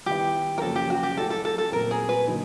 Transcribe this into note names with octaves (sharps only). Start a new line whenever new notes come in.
D#3 G3 B3 E4 G4
A#4
F#2 C#3 F3 A#3 C#4 A4
G4
F#4
G4
F#3 A3 C#4 E4 A4
A4
A4
A4
A#2 F#3 A3 C4 A#4
G#4
B4
D3 F#3 A#3 D#4